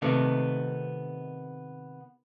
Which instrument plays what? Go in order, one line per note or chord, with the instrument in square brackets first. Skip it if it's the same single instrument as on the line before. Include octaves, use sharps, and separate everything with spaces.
[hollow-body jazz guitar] C3 D#3 A3 B3